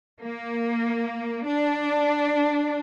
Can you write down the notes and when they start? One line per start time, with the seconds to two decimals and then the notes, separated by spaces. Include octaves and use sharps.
0.20 A#3
1.46 D4